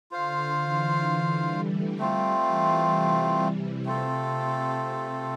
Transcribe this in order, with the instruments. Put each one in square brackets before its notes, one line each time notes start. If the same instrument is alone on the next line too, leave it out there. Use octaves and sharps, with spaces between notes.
[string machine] D3 [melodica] F4 C5 F5
[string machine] E3
D3
G3
A3
[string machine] G3 [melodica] A3 C4 F4
[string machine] E3
C3
[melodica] A3 C4 F4 A4
[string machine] C3